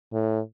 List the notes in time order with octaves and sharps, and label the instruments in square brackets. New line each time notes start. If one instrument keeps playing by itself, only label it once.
[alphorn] A2